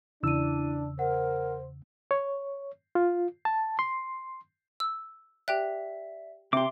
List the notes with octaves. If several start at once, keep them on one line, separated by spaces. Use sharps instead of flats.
E2 C#3 D4 E4 E6 D#7
A#4 C5 F#5
C#5
F4
A5
C6
E6
G4 D5 E5 G5 F#6 B6
C3 G4 E5 C6 D6